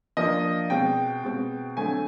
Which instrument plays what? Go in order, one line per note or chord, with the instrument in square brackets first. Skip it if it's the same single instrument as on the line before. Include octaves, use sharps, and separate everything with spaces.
[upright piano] F3 A#3 D4 D#5
B2 G#3 C4 G5
B2 G#3 C4
D3 F#3 A3 C4 G#5